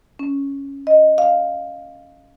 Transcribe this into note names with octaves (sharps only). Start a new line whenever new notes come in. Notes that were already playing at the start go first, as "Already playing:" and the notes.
C#4
D#5
F5